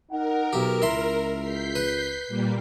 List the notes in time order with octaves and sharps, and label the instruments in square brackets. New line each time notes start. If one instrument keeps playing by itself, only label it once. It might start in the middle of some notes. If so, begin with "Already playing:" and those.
[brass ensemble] D#4 F#5 [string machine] A#4
[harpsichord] B1 G4
[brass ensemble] C#2 [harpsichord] E4 E5 C6
[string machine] G6 B6 C7
[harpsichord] B4
[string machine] A#2 G3 A#3